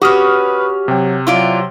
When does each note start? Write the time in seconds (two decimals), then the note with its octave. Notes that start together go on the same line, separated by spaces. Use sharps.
0.02 C#4 F#4 G4 B4 C#6 D#6 F6
0.88 C3 F#3 G5
1.27 F#3 E4 F4 D5 C6